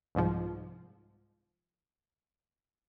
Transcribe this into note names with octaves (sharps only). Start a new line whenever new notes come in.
C2 G#2 F3